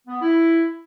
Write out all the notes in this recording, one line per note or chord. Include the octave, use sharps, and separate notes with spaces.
B3
E4